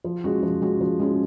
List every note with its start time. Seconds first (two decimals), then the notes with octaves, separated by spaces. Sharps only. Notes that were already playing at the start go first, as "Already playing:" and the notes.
0.04 F3
0.24 G#3 C#4 F#4
0.43 F3
0.62 G#3 C#4 F#4
0.81 F3
0.99 G#3 C#4 F#4